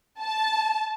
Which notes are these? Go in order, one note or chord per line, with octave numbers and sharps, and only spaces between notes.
A5